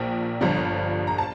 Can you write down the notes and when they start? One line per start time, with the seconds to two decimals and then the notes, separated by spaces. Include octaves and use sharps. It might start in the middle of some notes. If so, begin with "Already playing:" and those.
Already playing: A#1 A#2 F3 G5
0.41 G1 G2 F3
1.07 A#5
1.18 A5